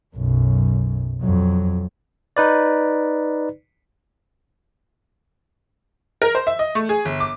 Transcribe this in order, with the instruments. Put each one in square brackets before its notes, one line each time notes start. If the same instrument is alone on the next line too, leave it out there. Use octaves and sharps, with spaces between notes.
[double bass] B1 F#2
F2 F#3
[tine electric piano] D#4 B4 D5
[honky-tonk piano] A#4
C5
E5
D#5
A3
G#4
G1
D6